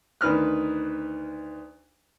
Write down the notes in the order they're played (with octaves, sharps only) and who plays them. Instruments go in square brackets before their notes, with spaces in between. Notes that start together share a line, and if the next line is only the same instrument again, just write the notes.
[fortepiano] D2 D#3 B4 F6 F#6